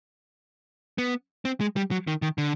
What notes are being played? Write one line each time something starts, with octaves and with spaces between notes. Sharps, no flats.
B3
C4
G#3
G3
F#3
D#3
D#3
D3